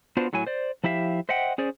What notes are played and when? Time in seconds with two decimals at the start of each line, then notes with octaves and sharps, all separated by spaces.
0.17 B3 D4 F4 F#4 C5
0.33 A2 F#3 E4 G#5
0.47 C5 D5
0.84 F3 E4 G4 E5 F5
1.29 C5 D#5 E5 F#5 G5
1.58 C#4 G#4 C5 D5